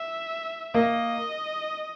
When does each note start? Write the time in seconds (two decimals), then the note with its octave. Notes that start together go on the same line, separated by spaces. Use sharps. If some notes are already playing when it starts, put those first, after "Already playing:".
Already playing: E5
0.74 A#3 D#5